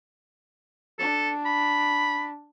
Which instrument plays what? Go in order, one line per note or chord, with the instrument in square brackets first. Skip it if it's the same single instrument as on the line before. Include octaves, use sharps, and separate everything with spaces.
[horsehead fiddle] D4 [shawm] A4
[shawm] B5